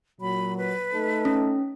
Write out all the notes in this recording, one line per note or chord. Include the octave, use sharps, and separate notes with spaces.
A#2 F#3 B5
B4
A3 D#4 A4
C#4